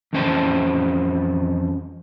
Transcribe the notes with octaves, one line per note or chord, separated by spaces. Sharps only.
F2 E3 C#4 C5 G5 A5